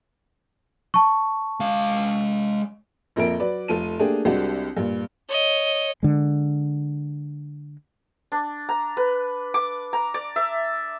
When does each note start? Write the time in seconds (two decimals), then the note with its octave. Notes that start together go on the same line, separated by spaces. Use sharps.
0.94 A5 C#6
1.60 G#3 F5
3.16 A#1 F2 A#4 E5 D7
3.39 F#3 B4 D5
3.68 F1 F3 A4 D#7
3.99 A3 A#3 D4 G4 G#4
4.25 C2 G3 G#3 C4 D4 F#4
4.77 G2 A#2
5.29 C#5 D#5
6.03 D3 G#3
8.32 D4
8.69 A#5
8.97 B4
9.54 D6
9.93 A#5
10.14 D5
10.36 E5